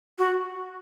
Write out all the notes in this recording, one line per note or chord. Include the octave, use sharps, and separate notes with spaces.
F#4